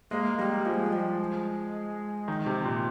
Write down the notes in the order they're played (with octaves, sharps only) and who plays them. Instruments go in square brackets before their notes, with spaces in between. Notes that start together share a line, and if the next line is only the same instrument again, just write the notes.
[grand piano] G#3 [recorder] A#3
[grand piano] G3 [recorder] A#3
[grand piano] F3 [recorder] G#3
[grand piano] F3 [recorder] G3
[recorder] G#3
[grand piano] D#3
C3
A#2